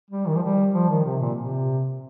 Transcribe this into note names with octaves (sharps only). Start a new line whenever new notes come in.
G3
D#3
F3
G3
F3
D#3
C3
A#2
C3